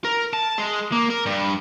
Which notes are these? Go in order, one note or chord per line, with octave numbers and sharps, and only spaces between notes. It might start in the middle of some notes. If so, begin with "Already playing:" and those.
A#4
A5
G#3
A#3
A#4
G2